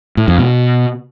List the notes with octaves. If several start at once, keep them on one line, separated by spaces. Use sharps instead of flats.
A2
F2
B2